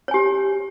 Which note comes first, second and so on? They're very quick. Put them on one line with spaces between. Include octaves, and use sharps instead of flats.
C#5 G#5 G4